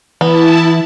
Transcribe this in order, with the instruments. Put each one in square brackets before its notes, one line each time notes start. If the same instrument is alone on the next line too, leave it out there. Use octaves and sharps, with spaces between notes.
[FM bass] E3 [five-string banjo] B3 [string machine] E4 A5